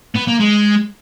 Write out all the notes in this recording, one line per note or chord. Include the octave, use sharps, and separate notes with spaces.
B3
A#3
G#3